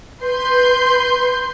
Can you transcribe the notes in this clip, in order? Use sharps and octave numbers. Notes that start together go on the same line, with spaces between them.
B4 C6 G6